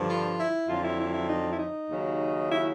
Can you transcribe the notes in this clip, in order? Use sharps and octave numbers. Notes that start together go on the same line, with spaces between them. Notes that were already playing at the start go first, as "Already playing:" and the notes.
Already playing: G2 D3 F3
F4
E4
F2 D3 F#3 F4
E4
E4
E4
D#4
E4
D#4
D#2 C#3 F#3
E4